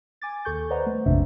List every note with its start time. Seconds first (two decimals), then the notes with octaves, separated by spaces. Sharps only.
0.22 G#5 D6 A6
0.45 D#2 A4 C#6 G6
0.70 B4 C5 D5 D#5 F#5 A#5
0.86 A3
1.06 A#1 F2 G#2 C3 D4 E5